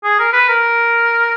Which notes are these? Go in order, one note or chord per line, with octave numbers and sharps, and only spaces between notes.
G#4
A#4
B4
A#4